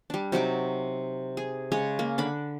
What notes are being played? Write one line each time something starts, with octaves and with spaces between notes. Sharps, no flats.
G3 D4
C3 F#3 D#4 D6
G#4
C#3 G#3 C#5 G#5
A#3
D3 D4 B5